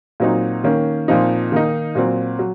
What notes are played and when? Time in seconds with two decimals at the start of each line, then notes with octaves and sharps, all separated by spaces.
0.20 A#2 F#3 C4 D#4
0.64 D#3 A#3 C#4
1.08 A#2 F3 C4 D#4
1.52 D#3 A#3 D#4
1.95 A#2 F#3 C4
2.39 F#3